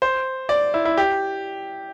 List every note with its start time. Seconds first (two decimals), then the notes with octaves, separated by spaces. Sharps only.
0.02 C5
0.49 D5
0.74 E4
0.85 E4
0.97 G4